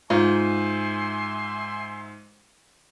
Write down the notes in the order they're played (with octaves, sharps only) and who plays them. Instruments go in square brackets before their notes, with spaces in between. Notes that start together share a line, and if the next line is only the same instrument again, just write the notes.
[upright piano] G#2 [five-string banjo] F4 [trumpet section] E5 G#5 C6